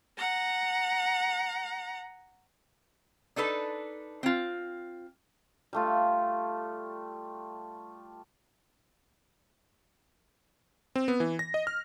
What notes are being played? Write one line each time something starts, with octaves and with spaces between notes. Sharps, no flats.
F#5 A#5
D4 D#4 A4 B4
C4 F4
G3 A3 F4
C4
B3
E3
A#6
D#5
F6